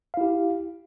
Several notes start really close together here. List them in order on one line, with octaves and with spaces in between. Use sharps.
F5 E4 G4